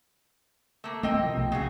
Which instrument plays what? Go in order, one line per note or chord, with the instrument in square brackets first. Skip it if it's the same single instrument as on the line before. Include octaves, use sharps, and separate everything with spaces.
[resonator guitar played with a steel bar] A3 A#3
[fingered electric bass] A3 A#3 [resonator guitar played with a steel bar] C4 D#5 G5
[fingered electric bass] C3 F3
B1
[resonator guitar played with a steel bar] C#3 F#4 G#4